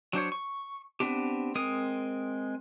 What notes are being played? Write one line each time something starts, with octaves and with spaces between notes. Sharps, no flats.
F#3 D4 C5 C#5
C#6
B3 C4 D4 G4
G#3 C4 A#4 D#6